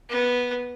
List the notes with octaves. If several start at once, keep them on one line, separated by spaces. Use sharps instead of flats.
B3